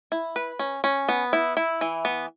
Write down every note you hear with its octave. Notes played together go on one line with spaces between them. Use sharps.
E4
B4
C#4
C#4
B3
E4
E4
E3
B3